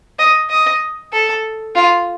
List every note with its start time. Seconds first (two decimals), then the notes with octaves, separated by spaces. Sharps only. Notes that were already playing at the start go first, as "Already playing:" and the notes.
0.19 D#5
0.50 D#5
1.13 A4
1.75 F4